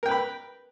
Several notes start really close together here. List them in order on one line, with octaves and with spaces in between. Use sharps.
A#4 G5 B4 B5